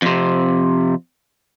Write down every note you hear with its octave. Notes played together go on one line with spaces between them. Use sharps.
F2 C3